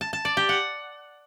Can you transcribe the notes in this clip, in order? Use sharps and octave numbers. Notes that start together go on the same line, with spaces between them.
A5
A5
D5
G4
F#5